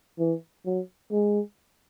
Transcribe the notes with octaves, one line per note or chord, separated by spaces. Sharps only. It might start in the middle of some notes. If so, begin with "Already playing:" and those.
E3
F#3
G#3